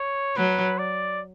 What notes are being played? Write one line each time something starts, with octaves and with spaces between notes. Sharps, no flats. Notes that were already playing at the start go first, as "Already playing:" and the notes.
Already playing: C#5
F#3 B4
D5